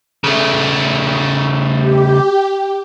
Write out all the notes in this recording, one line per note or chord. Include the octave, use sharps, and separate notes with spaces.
C#3 A3
G4